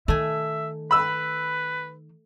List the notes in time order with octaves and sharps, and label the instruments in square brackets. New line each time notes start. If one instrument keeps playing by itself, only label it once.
[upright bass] D#3 [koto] A3 G#5 [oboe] E5
[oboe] B4 [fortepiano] B5 E6